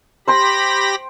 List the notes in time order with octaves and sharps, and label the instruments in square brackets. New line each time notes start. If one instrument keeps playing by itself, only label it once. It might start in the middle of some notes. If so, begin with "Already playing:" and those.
[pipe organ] G4 B5 A#6 [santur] C5 G5 C6